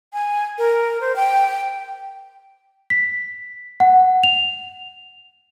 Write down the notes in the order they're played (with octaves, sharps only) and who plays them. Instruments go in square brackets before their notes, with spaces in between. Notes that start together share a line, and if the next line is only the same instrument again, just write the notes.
[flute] G#5
A#4
C5
G5
[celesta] B6
F#5
F7